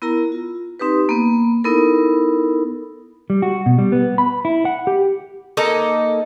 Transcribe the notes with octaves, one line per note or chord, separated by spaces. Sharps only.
B3 E4 A#4 A#5
F4
C4 D#4 G4 B4
A#3 B3
B3 D#4 E4 A4 A#4
G3
F#4
B2
G3
B3
B5
E4
F#5
G4
A#3 D#4 A4 D#5